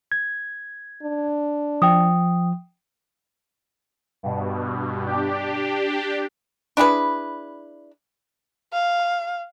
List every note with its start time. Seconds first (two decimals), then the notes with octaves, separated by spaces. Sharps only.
0.12 G#6
1.03 D4
1.82 F3 G5 D#6
4.23 G2 B2
5.06 D4 G4
6.77 D4 E4 G#4 B4
8.73 F5